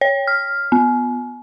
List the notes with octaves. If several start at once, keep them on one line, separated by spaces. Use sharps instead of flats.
C#5
F6
B3